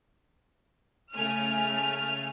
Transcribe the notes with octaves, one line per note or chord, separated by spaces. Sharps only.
C#3 A3 G#5 F6